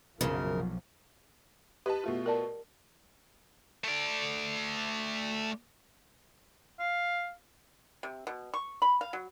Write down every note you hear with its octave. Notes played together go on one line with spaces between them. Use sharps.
B1 F#2 A#2 C#3 F3 F#3 A#4
G4 B4 D#5 A5
B2 A3 F4
A#4 D5 A5
A3 D5
F5
C3
B2
C#6
B5
F5
F#3